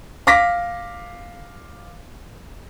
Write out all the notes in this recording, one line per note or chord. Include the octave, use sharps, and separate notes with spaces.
F5 D6 A#6 B6